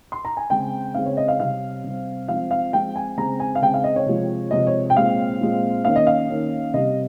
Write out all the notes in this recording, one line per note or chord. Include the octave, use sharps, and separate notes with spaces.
C6
A#5
G#5
C#3 G#3 C4 G5
C#3 G#3 C4 F5
C#5
D#5
F5
C3 G3 C4 F5
C3 G3 C4
F3 G#3 C4 F5
F5
F3 G#3 C4 G5
G#5
C#3 G#3 C4 A#5
G#5
F5
C#3 G#3 C4 G5
F5
D#5
C#5
C3 F3 G#3
C3 F3 G#3 D#5
C#5
G5
A#2 G#3 C4 F5
A#2 G#3 C4
D#3 A#3 C#4 F5
D#5
F5
D#3 A#3 C#4
C3 G3 C4 D#5